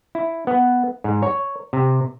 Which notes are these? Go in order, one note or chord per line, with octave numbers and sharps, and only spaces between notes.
E4
B3
G#2
C#5
C3